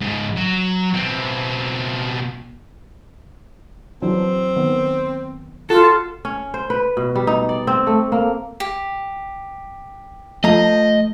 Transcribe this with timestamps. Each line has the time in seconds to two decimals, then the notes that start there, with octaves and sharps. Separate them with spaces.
0.01 G#2 C#3
0.37 F#3
0.94 B2 C4
4.02 E3 F#3 C4 D4
4.56 D#3 B3
5.70 F4 F#4 A4
6.25 C#4
6.54 C5
6.70 B4
6.97 B2
7.16 G3
7.27 D#4
7.49 D5
7.67 C4
7.87 A3
8.12 A#3
8.60 G4
10.44 F3 A3 D#5 A#5